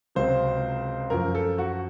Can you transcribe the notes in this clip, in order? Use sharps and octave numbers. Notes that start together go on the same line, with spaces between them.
C#2 C3 F#3 C5
F#2 F3 A#4
A4
F#4